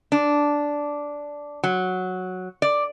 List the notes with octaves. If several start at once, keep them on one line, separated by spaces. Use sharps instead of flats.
D4
F#3
D5